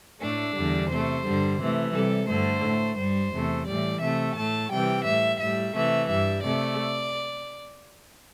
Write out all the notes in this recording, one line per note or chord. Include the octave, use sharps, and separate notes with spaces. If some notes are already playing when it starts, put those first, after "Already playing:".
A2 A3 D4
E2 D3 G3
C3 A3 C5
G2 D3 G3
C3 E3 A3
C3 G3 A4
G2 D3 A3 C5
A2 A3
G2 G3 C5
E2 C3 A3
A2 E3 G3 D5
C3 A3 E5
A2 A3 A5
C3 E3 G3 G5
A2 G3 E5
A2 G3 E5
C3 E3 A3 E5
G2 G3 E5
C3 A3 D5